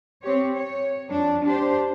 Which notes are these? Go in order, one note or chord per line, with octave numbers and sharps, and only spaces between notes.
C4 G4 C#5
C#5
F2 D4
D4 G4 C5